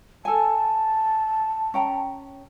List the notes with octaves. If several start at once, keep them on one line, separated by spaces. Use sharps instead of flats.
A4 G#5 A5
C#4 G5 A#5